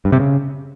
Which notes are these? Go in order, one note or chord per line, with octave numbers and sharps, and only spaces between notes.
G2
C3
C#3